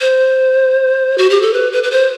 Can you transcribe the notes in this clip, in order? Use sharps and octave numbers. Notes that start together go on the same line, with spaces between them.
C5
F#4
G4
A4
B4
B4
B4
C5